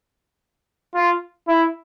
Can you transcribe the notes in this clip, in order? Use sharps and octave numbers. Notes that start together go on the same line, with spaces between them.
F4
E4